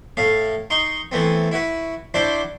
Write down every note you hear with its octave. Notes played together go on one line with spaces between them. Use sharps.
A2 A3 F5
D#4 C6 C#6
E3 A3 B3 C4
E4 F#4 B4
D4 E4 F#4 C5 D5